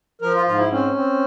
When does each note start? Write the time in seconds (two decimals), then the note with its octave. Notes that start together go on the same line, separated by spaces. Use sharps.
0.21 F3 A#4
0.34 F4
0.46 G#2 F4
0.58 E4
0.71 C4 C#4
0.95 C4